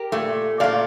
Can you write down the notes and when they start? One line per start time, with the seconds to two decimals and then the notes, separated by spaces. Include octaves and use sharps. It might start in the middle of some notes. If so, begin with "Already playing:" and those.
Already playing: G4 A#4
0.12 A#2 A3
0.60 A#2 A3 D5 F5